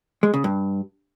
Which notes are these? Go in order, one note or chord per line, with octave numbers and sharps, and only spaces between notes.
G#3
C#3
G2